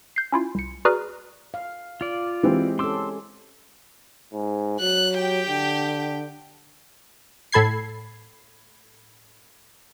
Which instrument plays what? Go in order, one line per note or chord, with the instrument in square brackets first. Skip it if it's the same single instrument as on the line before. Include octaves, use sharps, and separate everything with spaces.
[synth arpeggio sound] G6 C7
C#4 E4 F4
C2 C#7
F#4 G#4 B4 D5 A#5 F6
[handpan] F5
[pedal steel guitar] F4 D5
[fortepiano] E3 C4 [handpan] G#3 G4
[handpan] C#4 A4 [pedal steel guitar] C6 D6 E6
[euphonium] G#2
[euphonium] F#3 [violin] F#6
[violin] G4 G5
[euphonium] D3
[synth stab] A2 A4 B5 G#6 C7